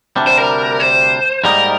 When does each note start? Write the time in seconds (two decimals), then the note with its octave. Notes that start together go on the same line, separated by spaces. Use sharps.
0.16 D2 C3 G3 D4
0.27 C5
0.38 A#4
0.80 C5
1.44 G#2 G3 A#3 D#4 A#4